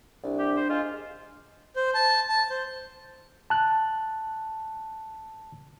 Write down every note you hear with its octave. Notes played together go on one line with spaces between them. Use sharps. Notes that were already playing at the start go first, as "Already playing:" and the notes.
C2 D4
G4
C5
G#3 F4
C5
A5
A5
C5
A5 F#6